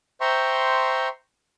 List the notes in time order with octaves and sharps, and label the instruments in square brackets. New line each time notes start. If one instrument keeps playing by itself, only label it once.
[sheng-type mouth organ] C5 E5 G5 A#5 C6 C#6